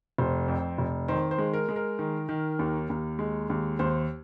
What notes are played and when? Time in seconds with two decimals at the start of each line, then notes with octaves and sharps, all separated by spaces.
0.18 F1 C5
0.48 F2
0.78 F1
1.08 D#3 C5
1.31 C5
1.38 G#3
1.54 A#4
1.69 G#3
1.76 A#4
1.99 D#3
2.29 D#3
2.59 D#2
2.90 D#2
3.19 G#3
3.50 D#2
3.79 D#2 C5